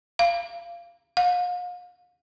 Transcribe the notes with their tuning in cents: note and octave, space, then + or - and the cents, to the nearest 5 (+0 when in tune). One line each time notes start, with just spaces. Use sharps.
F5 -20
F5 +40